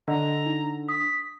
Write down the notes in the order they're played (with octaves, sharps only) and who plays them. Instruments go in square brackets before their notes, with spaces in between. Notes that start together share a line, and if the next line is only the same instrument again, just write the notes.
[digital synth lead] D3 [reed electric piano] D4 [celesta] D#5 [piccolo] A#5
[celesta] D#4
[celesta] D#6 [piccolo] B6